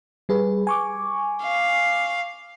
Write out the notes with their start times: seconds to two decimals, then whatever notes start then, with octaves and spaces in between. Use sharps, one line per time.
0.29 G3 G#4 B4
0.67 G#5 C#6 D6
1.43 F5